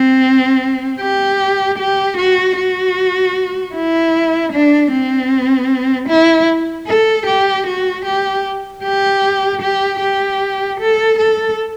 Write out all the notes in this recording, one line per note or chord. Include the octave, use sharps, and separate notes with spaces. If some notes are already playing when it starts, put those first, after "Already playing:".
Already playing: C4
G4
G4
F#4
F#4
E4
D4
C4
E4
A4
G4
F#4
G4
G4
G4
G4
A4
A4